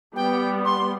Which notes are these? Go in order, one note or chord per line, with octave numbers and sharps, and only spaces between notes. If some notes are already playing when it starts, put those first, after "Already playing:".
G3 B3 G5
C6